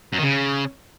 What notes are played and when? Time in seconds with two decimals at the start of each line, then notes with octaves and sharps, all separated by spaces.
0.13 F#2
0.18 D#3
0.23 C#3